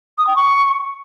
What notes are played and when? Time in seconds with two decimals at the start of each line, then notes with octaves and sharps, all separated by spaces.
0.18 D#6
0.27 G5
0.36 C#6